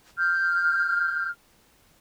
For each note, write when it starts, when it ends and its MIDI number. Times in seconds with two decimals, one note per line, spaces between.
0.17 1.29 89
0.17 1.29 91